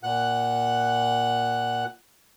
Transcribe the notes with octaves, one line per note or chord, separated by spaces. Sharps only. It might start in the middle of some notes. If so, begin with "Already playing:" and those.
A#2 F#5 F#6